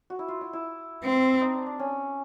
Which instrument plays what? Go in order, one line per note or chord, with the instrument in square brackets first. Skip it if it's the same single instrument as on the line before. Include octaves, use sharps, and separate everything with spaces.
[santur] F#4
E4
F4
E4
E4
[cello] C4
[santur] D#4
D4
D4
C#4